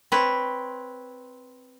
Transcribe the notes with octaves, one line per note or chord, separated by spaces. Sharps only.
C4 B4 C#5